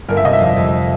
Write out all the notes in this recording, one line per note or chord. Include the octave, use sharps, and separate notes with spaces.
G1 A#4
E5
C3 D#5
E5
F2 F5
F2